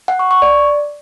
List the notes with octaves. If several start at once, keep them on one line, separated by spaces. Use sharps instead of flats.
F#5
C#6
C#6
D5